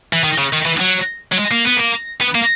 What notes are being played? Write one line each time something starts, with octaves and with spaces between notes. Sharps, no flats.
E3
D#3
C#3
D#3
E3
F#3
F#3
G#3
A#3
B3
A#3
B3
A#3